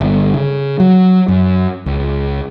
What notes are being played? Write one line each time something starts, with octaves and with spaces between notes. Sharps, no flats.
G1
C#3
F#3
F#2
C#2